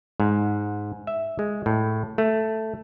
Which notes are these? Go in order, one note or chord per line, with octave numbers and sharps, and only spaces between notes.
G#2
E5
G#3
A2
A3